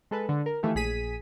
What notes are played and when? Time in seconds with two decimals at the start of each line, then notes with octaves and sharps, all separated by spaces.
0.11 G#3 A4 B4
0.29 D3
0.46 A#4
0.63 D#3 E3 A3 F4 G4
0.75 A#1 G#4 B6 D#7